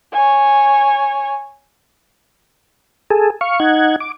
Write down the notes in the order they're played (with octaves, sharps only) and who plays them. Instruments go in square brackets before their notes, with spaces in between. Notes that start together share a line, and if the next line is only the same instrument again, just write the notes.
[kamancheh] C#5 G#5
[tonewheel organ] G#4 A4
F5 C#6
D#4 F#5 G#6
D6